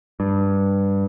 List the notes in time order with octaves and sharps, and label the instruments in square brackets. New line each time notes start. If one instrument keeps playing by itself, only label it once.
[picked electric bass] G2